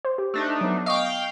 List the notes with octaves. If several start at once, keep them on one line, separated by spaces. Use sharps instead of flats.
C5
G4
A3 D4 D#4
F#3 B3
D#5 F5 G5 C#6